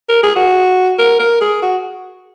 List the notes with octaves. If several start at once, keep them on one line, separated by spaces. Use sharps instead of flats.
A#4
G#4
F#4
A#4
A#4
G#4
F#4